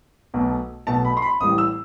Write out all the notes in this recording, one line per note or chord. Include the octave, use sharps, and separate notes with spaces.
B1 B2 A3
B1 B2 A3 A5
B5
C6
B5
A1 A2 E3 G3 D#6
E6